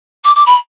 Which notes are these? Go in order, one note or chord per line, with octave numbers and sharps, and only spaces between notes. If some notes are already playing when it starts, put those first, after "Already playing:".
D6
D6
B5